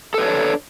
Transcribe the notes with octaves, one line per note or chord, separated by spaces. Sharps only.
D4 A4 B4 C#5